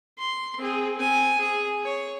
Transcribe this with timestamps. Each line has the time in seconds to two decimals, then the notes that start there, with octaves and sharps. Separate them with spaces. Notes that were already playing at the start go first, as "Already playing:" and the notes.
0.19 C6
0.59 C4 G#4
0.97 C4 G#5
1.39 G#4 G#5
1.84 C#5